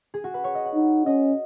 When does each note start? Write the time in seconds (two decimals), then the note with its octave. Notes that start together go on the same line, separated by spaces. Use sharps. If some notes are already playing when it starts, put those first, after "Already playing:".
0.14 G#4
0.24 F#4
0.34 B4
0.44 C#5
0.55 D#5
0.65 F#5
0.75 D#4
1.06 C#4 D#5